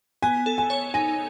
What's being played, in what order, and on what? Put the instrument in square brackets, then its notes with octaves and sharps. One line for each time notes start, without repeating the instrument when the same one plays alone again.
[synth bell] B3 [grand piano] G#5
[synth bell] A4
[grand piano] G#5
[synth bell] C#5
[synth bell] D#4 [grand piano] G#5